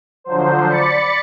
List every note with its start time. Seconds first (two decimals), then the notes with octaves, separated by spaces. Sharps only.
0.24 D3 F3 F#3 C5
0.69 D5 B5 A6 C#7